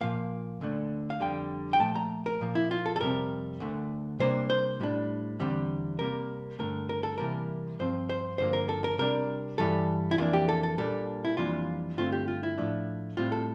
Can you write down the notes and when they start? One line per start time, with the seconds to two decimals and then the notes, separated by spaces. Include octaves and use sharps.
0.01 A#2 F3 A#3 F5
0.61 D2 D3 A3 D4
1.10 F5
1.20 F2 D3 G3 G5
1.73 G5
1.80 A#2 F3 A3 A5
1.96 A#5
2.26 A#4
2.41 A#2 F3 A#3
2.55 E4
2.71 F4
2.86 A4
2.96 A4
3.00 F2 C3 G3 C4 A#4
3.60 D2 D3 A3
4.19 C3 G3 A#3 D4 C5
4.50 C5
4.80 A2 G3 D4
5.40 E2 D3 G3 C4
5.99 C3 G3 A#3 A#4
6.59 G2 D3 A3 A#4
6.89 A#4
7.03 A4
7.18 C3 E3 G3 A#3 A#4
7.79 G2 F3 C4 C5
8.09 C5
8.38 G2 D3 F3 A#3 C5
8.53 A#4
8.69 A4
8.84 A#4
8.98 C3 G3 D4 A#4
9.58 G2 E3 G3 A4
10.11 E4
10.18 F2 E3 A#3 D4 F4
10.33 G4
10.49 A4
10.63 A4
10.78 A#2 G3 A#3 D4 A4
11.25 E4
11.37 F2 E3 G3 A#3 D4 F4
11.97 G2 D3 A3 C4 F4
12.12 G4
12.28 F4
12.43 E4
12.58 A2 F3 A3 D4
13.17 A2 G3 C4 F4
13.32 A4